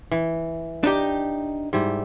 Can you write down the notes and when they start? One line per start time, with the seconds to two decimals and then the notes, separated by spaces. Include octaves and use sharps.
0.12 E3
0.84 D4 D#4 G4
1.73 G#2 G3 E4